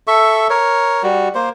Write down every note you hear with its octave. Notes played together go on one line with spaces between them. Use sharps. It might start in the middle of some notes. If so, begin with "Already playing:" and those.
A4 E5 C#6
A#4 C#5
G3 F#4
A#3 C5